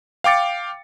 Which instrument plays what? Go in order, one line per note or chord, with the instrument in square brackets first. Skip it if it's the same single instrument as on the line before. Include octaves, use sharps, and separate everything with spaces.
[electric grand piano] F5 G5 D6 A6 C#7